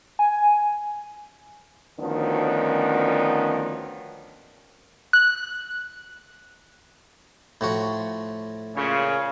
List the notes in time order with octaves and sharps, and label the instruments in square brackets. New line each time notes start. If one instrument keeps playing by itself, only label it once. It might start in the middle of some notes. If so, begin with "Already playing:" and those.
[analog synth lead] G#5
[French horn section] D2 D#3 F3 B3 C#4 D5
[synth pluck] F#6
[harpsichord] A2 F3 F#4
[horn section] A#2 C#3 C#5